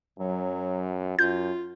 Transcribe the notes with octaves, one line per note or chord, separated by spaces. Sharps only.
F#2 F#3
F#2 F4 G6